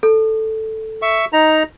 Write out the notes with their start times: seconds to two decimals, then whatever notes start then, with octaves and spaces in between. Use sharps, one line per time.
0.03 A4
1.02 E5 C#6
1.33 D#4 A#5